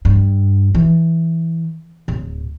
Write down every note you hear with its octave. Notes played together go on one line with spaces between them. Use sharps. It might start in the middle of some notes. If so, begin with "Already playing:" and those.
G2
E3
D1